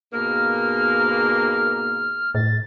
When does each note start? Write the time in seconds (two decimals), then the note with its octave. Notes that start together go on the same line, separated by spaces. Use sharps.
0.13 G#2 B2 A#3 F6
2.35 A2 A6